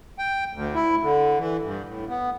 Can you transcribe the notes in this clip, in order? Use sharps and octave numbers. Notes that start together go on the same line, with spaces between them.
G5
D2
E4
D3
E3
G2
A2
B3